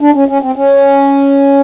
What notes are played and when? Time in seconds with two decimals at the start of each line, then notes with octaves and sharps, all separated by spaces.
0.01 D4
0.15 C#4
0.29 C#4
0.42 C4
0.56 C#4